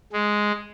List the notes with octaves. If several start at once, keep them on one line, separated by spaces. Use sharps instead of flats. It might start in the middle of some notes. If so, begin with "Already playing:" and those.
G#3